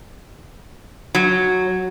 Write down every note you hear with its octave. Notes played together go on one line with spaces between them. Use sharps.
F#3